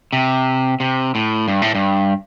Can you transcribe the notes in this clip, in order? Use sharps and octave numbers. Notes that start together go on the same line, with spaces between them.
C3
C3
A2
G2
A2
G2